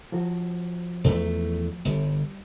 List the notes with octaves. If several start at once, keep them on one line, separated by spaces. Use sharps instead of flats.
F3 F#4
E2 A3
G1 G3